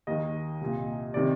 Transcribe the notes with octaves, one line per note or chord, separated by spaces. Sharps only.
D#2 D#3 D#5
C2 A#2
C3 D#3 D5